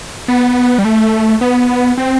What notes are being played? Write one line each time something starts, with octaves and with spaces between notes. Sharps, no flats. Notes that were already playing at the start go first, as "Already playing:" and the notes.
B3
G3
A3
B3
C4